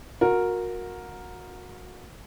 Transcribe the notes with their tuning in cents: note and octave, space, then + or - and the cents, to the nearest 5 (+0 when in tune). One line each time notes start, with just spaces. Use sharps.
F#4 -30 A#4 +0